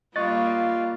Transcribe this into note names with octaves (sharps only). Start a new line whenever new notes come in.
G3 A#3 F4 D#5 C#6 F#6 A6